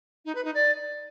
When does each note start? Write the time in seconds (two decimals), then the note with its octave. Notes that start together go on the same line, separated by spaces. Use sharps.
0.25 D#4
0.35 B4
0.44 D#4
0.54 D5